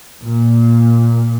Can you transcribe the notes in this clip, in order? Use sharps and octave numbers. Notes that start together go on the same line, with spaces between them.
A#2